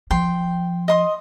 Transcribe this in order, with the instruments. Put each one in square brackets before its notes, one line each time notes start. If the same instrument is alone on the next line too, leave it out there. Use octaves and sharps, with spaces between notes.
[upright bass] F3 [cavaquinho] G5 C6
[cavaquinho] D#5 C6 D#6